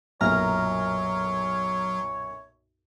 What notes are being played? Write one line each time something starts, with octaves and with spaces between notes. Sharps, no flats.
B1 F#2 A#2 F#3 C#5 A#5 F6